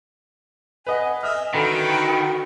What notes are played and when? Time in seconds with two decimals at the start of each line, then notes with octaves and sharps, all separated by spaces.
0.87 B4 D#5 F#5 G#5
1.23 D#5 E5 F6
1.54 D3 D#3 F#4 B4